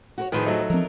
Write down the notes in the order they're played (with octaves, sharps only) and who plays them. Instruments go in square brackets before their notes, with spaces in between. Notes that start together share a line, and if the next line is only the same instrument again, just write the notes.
[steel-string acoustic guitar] F#4 A#4 C#5
[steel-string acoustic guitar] A2 F3 G#4 [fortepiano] D#3 B4 C5
[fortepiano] F#3 A3 D#4
[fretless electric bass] F3 C4 [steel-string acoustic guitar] D4 A#4